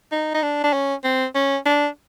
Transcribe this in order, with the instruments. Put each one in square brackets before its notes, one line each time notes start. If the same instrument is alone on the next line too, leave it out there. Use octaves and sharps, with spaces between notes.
[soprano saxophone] D#4
D#4
D4
D4
C#4
C4
C#4
D4